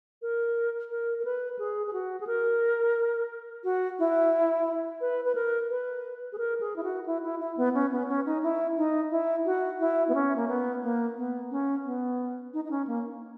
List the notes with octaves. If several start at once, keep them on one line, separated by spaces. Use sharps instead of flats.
A#4
A#4
A#4
B4
G#4
G#4
F#4
G#4
A#4
F#4
E4
B4
B4
A#4
B4
G#4
A#4
G#4
E4
F#4
E4
E4
E4
B3
C#4
B3
C#4
D#4
E4
D#4
E4
F#4
E4
B3
C#4
A#3
B3
A#3
B3
C#4
B3
D#4
D#4
C#4
A#3